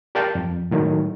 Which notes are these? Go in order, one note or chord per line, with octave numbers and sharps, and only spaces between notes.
G4 A#4 D5 F5 G5 A5
F2
A2 D#3 F#3